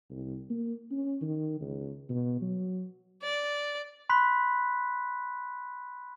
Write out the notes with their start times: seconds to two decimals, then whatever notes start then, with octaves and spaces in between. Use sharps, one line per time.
0.10 C2
0.50 A#3
0.91 C#4
1.22 D#3
1.61 C#2
2.09 B2
2.42 F#3
3.23 D5
4.09 B5 C6 F#6 B6